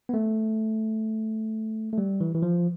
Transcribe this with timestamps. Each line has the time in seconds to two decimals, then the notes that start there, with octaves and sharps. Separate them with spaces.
0.09 B3
0.14 A3
1.93 A3
1.98 G3
2.21 E3
2.35 E3
2.42 F3